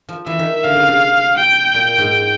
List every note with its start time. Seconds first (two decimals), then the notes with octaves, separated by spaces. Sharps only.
0.09 F3
0.26 E3 E5
0.39 D#3
0.64 D3 F5
0.77 C#3
0.88 C3
1.37 G5
1.74 A#2
1.98 G#2